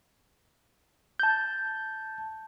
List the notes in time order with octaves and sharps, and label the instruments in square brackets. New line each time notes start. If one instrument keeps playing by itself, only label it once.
[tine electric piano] A5 G6